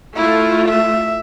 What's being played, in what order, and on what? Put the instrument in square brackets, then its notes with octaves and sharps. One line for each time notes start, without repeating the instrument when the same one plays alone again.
[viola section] A3 F4 [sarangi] E4
[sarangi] E5